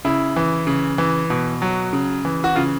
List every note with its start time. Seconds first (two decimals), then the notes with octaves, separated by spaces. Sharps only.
0.05 C#3 E4
0.36 E3
0.67 C#3
0.98 E3
1.30 B2
1.62 F#3
1.93 C#3
2.25 E3
2.44 F#4
2.56 C#3 F4